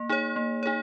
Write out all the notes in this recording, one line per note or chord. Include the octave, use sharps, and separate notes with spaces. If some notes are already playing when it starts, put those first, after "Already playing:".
Already playing: A#3
D#4 G#4 C#5
A#3
D#4 G#4 C#5